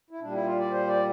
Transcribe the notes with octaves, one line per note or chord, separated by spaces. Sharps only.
E4
A#2 G3 D4
E4
F4
D5
C5
D5